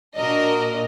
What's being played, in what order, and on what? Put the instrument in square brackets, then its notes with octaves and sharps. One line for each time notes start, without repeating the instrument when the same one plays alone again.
[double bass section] A#2 [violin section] D4 F#4 A#4 D#5